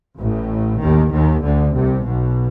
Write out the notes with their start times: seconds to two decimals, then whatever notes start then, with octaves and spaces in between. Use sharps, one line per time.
0.18 A1 A2
0.80 D#2 D#3
1.11 D#2 D#3
1.42 D2 D3
1.74 C2 C3
2.04 B1 B2